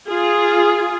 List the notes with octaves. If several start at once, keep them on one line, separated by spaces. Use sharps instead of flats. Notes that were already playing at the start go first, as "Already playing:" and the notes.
F4 G#4